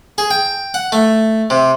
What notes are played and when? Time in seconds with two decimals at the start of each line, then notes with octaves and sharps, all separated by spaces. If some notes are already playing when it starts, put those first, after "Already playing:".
0.18 G#4
0.30 G5
0.74 F#5
0.92 A3
1.50 C3